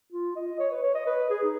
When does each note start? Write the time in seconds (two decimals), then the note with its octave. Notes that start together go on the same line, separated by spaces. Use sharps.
0.12 F4
0.36 D#5
0.59 C#5
0.71 B4
0.83 C#5
0.95 D#5
1.06 B4
1.30 G#4
1.43 D#4